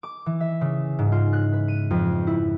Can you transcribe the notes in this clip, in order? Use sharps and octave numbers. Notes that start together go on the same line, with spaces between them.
D6
E3
E5
C#3
G#2
F4
F#6
B4
D#7
F2
E4